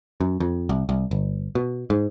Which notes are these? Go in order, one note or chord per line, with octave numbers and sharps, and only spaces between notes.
F#2
F2
C2
C2
G1
B2
G#2